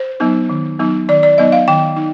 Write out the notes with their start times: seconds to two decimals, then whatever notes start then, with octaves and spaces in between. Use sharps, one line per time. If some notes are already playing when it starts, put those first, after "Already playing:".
Already playing: C5
0.20 F#3 B3 D#4
0.49 D#3
0.79 F#3 B3 D#4
1.09 D#3 D5
1.23 D5
1.38 F#3 B3 D#4 D#5
1.52 F5
1.68 D#3 G5
1.96 D#4